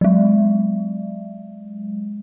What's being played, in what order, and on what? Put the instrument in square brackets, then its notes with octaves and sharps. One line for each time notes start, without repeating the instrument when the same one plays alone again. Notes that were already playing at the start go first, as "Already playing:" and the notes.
[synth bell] F#3 G#3